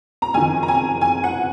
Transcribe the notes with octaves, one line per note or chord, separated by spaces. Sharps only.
A#5
F#1 F2 D#3 G#5
A#5
G#5
G#5
F#5